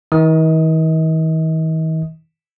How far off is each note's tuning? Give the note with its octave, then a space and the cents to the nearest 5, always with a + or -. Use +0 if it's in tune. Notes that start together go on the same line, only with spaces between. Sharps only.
D#3 +45 D#5 +40 D#6 +0